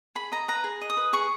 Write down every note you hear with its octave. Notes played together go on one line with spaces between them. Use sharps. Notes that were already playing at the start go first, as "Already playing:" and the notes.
G#4 B5
D#5 A#5
B4 A#5
G#4
D#5
D#6
B4
G#4 C#6